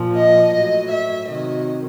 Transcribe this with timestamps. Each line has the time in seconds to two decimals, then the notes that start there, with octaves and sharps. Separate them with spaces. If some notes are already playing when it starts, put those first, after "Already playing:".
Already playing: A#2 F3
0.15 D#5
0.52 A2 F#3 D#5
0.89 E5
1.26 C3 D#3 F#3 D#5